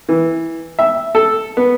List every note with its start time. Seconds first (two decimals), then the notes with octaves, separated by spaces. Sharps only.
0.09 E3
0.79 E5
1.15 A4
1.57 B3